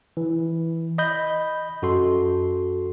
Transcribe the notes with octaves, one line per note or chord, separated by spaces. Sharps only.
E3
D#5 B5 G6
F#2 F#4 A4 C6